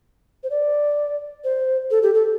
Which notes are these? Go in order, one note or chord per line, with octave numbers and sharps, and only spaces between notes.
C5
D5
C5
A4
G4
A4